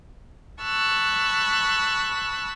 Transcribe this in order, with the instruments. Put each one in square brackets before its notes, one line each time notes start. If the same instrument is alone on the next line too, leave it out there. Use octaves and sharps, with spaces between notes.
[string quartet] A5 B5 C#6 E6 F#6